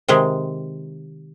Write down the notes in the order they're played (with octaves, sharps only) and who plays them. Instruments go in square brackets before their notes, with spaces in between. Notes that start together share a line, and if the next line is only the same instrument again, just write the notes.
[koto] C3 D#3 G#3